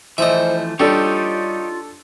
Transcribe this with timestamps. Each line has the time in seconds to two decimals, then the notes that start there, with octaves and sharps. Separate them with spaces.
0.18 E3 F3 A3 C5 D#5 E5
0.80 G3 D4 D#4 F4 G4 A4 C#5 D5